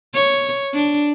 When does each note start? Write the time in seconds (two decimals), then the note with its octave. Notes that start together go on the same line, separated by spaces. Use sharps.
0.14 C#5
0.74 D4